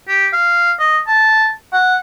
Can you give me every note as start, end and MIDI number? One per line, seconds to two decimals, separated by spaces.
0.09 0.28 67
0.33 0.72 77
0.79 0.99 75
1.07 1.50 81
1.73 1.97 78